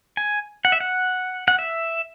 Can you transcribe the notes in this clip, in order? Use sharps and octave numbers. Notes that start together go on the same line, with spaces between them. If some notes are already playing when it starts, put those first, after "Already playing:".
G#5
F#5
E5
F#5
F#5
E5